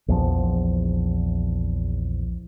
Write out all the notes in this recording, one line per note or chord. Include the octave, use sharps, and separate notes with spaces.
A#1 E2 F3